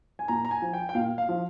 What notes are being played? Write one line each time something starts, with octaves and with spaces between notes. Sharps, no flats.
G#5
A#2 A#5
A#5
G#5
F3
G5
G5
A#2 F5
F5
F3